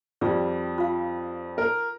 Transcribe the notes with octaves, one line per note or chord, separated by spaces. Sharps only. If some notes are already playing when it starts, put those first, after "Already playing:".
F2 G3 F4 G#4 D5
F4 F5
A#4